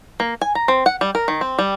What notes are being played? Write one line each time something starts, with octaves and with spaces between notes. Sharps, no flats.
A#3
G#5
A#5
C4
F#5
G3
A#4
D#3
C4
G3